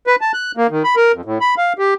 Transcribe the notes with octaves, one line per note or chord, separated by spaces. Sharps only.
B4
A5
F#6
A#3
D#3
B5
A#4
F2
A2
B5
F5
G4